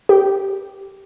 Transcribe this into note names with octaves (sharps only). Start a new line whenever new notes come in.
G4